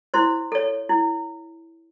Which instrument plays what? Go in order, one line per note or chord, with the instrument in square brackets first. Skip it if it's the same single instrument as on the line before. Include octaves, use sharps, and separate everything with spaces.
[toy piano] E4 C5 C6
A4 C#5
E4